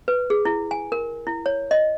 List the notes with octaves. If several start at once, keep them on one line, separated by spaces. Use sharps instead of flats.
B4
G#4
E4
G#5
A#4
E4
C#5
D#5